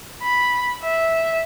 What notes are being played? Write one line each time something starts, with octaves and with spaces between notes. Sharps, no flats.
B5
E5